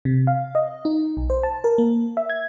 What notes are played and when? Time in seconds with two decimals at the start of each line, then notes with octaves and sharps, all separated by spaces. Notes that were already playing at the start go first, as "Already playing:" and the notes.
0.05 C3
0.27 F5
0.55 D#5
0.85 D#4
1.17 B1
1.30 C5
1.43 A5
1.64 A#4
1.78 A#3
2.17 E5
2.30 G#6